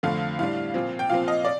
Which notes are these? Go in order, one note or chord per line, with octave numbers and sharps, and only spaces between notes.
F2 D3 F3 A3 F5
A2 G3 D4 F5
A#2 F3 C4
G5
A#2 F3 C4 F5
D#5
D5